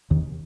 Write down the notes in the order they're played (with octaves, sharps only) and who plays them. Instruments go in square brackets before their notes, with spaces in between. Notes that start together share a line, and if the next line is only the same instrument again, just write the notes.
[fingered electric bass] D#2 D#3